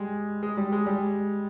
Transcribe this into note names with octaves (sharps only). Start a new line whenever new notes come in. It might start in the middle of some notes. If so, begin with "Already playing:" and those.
Already playing: G3 G#3
G#3
G3
G#3
G3